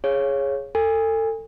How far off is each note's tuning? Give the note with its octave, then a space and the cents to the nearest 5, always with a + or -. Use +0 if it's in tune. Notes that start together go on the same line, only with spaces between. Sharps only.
G#4 +0 C#5 -10 F5 +0
A4 +30 G#5 -30